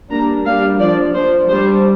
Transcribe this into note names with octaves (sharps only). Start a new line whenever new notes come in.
G3 A#3 D4 A#5
G3 A#3 D4 F5
F3 D4 D5
F3 D4 C5
G3 D4 C5